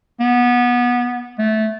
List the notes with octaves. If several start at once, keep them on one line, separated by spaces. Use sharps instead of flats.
B3
A3